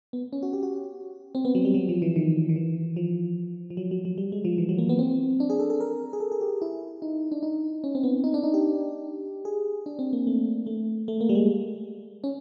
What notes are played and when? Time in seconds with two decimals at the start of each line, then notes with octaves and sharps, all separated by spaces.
0.13 B3
0.33 C#4
0.43 F#4
0.53 G4
0.63 F#4
1.35 C4
1.45 B3
1.55 F#3
1.65 G3
1.74 F#3
1.89 F3
2.02 E3
2.16 D#3
2.49 D#3
2.56 E3
2.96 F3
3.70 F3
3.77 F#3
3.91 F#3
4.05 F#3
4.18 G3
4.32 G#3
4.45 F3
4.58 E3
4.69 F#3
4.78 A#3
4.89 B3
4.99 C4
5.40 D4
5.50 G#4
5.59 A4
5.70 A4
5.80 A#4
6.13 G#4
6.20 A4
6.32 G#4
6.41 G4
6.62 E4
7.02 D#4
7.32 D4
7.43 D#4
7.84 C#4
7.95 C4
8.03 B3
8.24 D#4
8.34 D4
8.43 D#4
8.54 G4
9.45 G#4
9.86 D4
9.99 C4
10.13 A#3
10.27 A3
10.66 A3
11.08 A3
11.21 A#3
11.29 G3
11.35 G#3
12.24 C#4